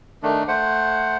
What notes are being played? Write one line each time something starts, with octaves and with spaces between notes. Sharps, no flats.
D#3 A3 D4
A3 C5 F#5